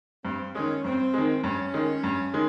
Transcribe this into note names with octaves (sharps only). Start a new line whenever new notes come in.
G2 C4
D#3 G#3 C#4
G2 C4
D#3 G#3
G2 C#4
D#3 G#3
G2
D#3 G#3